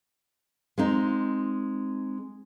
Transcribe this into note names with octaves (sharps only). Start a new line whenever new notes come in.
G#3 C4 D#4